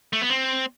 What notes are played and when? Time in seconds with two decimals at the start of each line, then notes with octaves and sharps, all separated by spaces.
0.13 A3
0.22 B3
0.30 C4